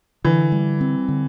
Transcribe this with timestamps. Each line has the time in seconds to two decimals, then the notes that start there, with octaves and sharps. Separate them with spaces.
0.25 D3 E3
0.52 G3
0.81 C4
1.08 D3